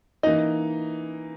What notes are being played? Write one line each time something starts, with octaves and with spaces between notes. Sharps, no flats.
E3 A#3 D#4 D#5